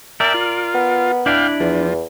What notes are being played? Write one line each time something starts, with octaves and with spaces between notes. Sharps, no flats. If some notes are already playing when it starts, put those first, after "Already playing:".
A#4 D5 E5 G5 A5
F4
B3
D4 E4 D5 F5 G5
E2 F3